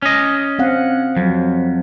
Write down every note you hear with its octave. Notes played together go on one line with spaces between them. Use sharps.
C#4 D#5
C4 F5 F#5
F2 F#3